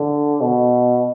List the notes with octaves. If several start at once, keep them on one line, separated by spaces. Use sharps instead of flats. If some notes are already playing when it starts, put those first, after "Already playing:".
Already playing: D3
B2